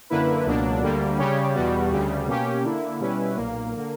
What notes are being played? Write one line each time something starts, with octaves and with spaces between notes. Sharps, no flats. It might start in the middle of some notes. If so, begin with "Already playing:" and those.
F#2 D3 A#3 E4 B4
C#2 B2 F#3 A#3 D4
D2 D3 G3 A#3
C#3 G3 C#4 G4 C#5
E2 B2 G3 B3 F#4
D2 C#3 G3
B2 A#3 C#4 G4
D3 A#3 E4
B2 G3 C#4 E4 B4
B1 A#2 A#3
D3 A#3